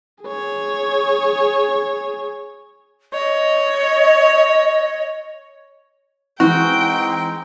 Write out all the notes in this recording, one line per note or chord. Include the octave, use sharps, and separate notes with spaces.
G#4 C#5
C#5 D#5
E3 G#3 C4 D#4 F#4 G5